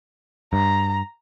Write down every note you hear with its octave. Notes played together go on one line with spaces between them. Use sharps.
G2 A#5